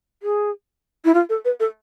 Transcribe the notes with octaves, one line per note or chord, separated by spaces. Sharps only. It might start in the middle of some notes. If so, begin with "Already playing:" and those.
G#4
E4
F4
A4
B4
A4